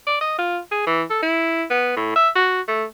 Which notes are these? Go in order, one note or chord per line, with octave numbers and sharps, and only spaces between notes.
D5
D#5
F4
G#4
E3
A4
E4
B3
A2
E5
F#4
A3